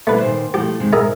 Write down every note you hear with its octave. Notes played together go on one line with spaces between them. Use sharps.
G3 A3 A#3 E4 B4
A#2 D#3 C5
F3 A3 E4 G4
C3 D#3 G#3
G#2 G#4 A#4 E5